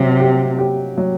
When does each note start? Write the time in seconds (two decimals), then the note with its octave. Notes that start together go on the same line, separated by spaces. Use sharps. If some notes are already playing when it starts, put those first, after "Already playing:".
Already playing: C3 F#3
0.20 G4
0.58 G4
0.97 F#3